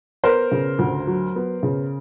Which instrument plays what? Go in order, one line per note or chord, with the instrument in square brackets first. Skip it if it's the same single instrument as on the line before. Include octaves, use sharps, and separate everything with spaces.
[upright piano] B3 A#4 C5
C#3
D2
F#3
B3
C#3